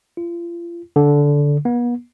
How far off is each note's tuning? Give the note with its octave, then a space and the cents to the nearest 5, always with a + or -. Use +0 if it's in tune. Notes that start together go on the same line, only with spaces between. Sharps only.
F4 -35
D3 -15
B3 -40